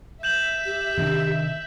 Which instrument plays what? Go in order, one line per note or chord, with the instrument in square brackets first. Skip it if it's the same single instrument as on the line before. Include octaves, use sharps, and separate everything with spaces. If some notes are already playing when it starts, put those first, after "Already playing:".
[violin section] E5 [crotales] G6 E7 F#7
[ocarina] G4
[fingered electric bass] C3 D#3 D4